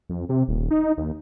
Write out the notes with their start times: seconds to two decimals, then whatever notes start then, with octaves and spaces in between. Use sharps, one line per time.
0.10 F2
0.29 C3
0.48 D#1
0.71 D#4
0.98 D#2